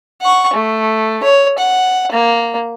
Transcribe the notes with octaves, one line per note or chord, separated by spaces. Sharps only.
F#5 C#6
A3
C#5
F#5
A#3